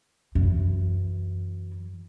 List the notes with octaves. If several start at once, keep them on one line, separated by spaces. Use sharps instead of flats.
F#2 E3